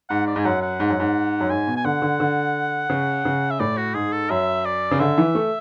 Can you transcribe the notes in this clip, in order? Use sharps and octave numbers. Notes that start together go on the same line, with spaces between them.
G#2 F#5
D5
G#2 G#5
F#2 F#5
F#5
G#2
F#2
G#2
F#2
G#2 G#5
B2
G#5
D3 F#5
D3
D3
C#3
C#3
E5
A2 D5
F#4
G#2 G#4
A4
F#2 E5
D5
C#3
D3 E5
E3
A3